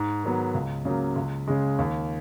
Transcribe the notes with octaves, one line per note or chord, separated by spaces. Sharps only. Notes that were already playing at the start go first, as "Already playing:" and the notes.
Already playing: G#2
D#3 F#3 B3
C#2
C#3 F#3 A#3
C#2
C#3 G#3
D#2